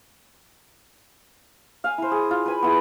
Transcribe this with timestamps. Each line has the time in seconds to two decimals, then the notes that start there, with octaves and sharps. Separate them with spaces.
1.84 F5 G#5
1.98 E4 C5
2.11 G#4
2.31 F4
2.46 B4 G#5 B5
2.62 B3 E4 G#4